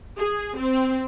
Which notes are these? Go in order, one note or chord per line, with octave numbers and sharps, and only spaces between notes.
G#4
C4